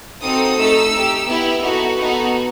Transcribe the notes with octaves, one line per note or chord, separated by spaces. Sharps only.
C4 D#4 F#4 A4 D#6
A3 D#4 A4 E6
D#4 G4
B3 E4 G4
B3 D#4 F#4 A4
B3 D#4 F#4 A4